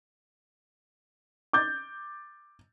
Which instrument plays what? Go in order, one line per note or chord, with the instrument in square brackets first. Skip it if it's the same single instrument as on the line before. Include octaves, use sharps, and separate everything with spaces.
[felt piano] D6 G6 A6